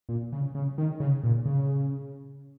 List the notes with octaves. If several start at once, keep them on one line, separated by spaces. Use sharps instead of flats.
A#2
C#3
C#3
D#3
C#3
A#2
C#3